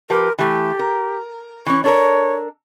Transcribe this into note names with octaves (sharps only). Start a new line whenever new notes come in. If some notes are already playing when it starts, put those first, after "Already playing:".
F3 G4 A#4 B4
E3 A3 G4
A#4
E3 C#4 C#6
D4 A4 A#4 C#5